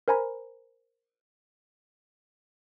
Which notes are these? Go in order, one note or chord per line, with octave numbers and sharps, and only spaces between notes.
A#4 C5 G#5 A#5 B5